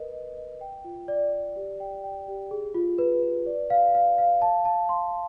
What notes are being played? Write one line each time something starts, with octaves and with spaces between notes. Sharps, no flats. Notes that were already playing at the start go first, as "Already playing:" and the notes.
Already playing: A#4 B4 D#5
D#5
D#5
G5
F4
D5
D5
G4
G5
G5
G4
G#4
F4
B4
B4
D5
F5
F5
F5
A5
A5
C6